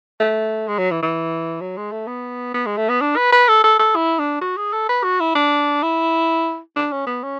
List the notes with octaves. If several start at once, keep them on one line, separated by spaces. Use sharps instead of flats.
A3
G#3
F#3
E3
E3
F#3
G#3
A3
B3
B3
G#3
A3
B3
D4
B4
B4
A4
A4
A4
E4
D4
F#4
G#4
A4
B4
F#4
E4
D4
E4
D4
C#4
B3
C#4